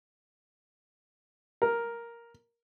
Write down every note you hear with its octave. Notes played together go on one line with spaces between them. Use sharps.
A#4